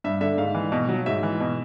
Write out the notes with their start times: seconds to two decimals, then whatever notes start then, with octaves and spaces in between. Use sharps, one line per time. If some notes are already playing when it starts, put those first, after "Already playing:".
0.04 G2 E5
0.21 D3 E5
0.38 G#2 F5
0.55 E3
0.72 B2
0.88 F#3
1.06 G#2 E5
1.23 E3
1.40 B2